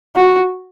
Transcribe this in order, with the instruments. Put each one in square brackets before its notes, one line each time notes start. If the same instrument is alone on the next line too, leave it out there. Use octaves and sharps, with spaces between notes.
[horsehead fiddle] F#4